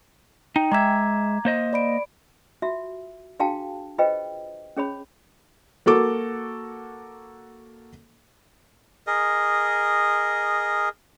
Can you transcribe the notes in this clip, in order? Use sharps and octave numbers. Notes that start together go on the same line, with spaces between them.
D#4 G5
G#3 E5 A#5 D6 G#6
A#3 C5 D#5
D5 B5 D7
F4 F#4 E5
D4 F#4 G#4 F5 G5 A5
F4 G#4 B4 C5 D#5 G5
C#4 G#4 C#5 B5
A#3 F#4 A4 D6
G#4 A#4 D#5